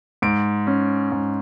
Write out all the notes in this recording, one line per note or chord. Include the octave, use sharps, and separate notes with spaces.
G#2 D7
C#4
G#2